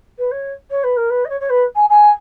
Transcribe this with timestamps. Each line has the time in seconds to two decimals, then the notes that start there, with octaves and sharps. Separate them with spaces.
0.18 B4
0.31 C#5
0.70 C#5
0.83 B4
0.96 A#4
1.10 B4
1.24 D#5
1.29 C#5
1.40 C#5
1.49 B4
1.75 G#5
1.89 G#5